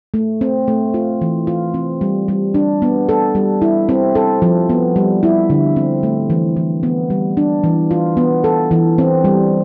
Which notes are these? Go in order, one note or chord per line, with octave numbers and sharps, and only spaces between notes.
A3
C4
A3
F4
E3
F4
C4
G3
G3
D4
B3
A4
G3
E4
C4
A4
F3
B3
G3
E4
D3
C4
A3
E3
E3
B3
G3
D4
E3
F4
B3
A4
E3
C4
G3